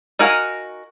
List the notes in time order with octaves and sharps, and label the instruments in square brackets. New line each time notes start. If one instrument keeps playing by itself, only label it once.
[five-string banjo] D#4 F#4 A#4 F5 G#5